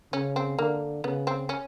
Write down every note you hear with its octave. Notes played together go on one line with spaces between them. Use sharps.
C#3 C#4
C4
D3 A#3
C#3 B3
C4
C#4